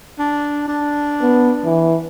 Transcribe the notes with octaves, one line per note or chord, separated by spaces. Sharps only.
D4
D4
B3
E3